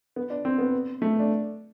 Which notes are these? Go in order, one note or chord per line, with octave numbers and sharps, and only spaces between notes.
B3
D4
C4
B3
A3
D4